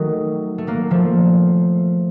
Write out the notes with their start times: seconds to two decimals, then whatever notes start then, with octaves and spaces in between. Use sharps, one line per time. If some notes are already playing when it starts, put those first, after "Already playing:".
Already playing: D#3 F#3 A3
0.58 A3
0.67 F#3 A#3
0.91 F3 A3